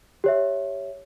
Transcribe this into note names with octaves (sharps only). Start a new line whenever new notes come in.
G4 C#5 E5